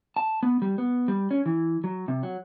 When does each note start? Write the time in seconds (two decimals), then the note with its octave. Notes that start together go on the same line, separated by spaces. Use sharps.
0.16 A5
0.43 B3
0.62 G3
0.78 B3
1.08 G3
1.31 C#4
1.46 E3
1.84 F#3
2.08 C3
2.23 F#3